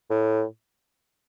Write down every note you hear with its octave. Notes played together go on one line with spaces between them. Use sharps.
A2